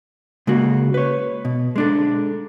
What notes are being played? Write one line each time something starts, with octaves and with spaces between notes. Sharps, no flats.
C#3 G#3 A#3 F#4
B4 C#5
B2
G#3 D4 A4